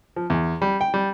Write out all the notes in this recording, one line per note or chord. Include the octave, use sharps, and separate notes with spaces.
F3
E2
G3
G5
G3